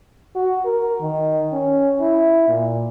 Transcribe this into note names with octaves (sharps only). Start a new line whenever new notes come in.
F#4
A#4
D#3
C#4
E4
A#2